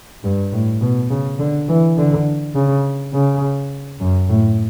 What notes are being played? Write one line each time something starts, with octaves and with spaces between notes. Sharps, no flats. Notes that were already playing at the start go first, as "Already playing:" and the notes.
G2
A2
B2
C#3
D3
E3
D3
C#3
C#3
F#2
A2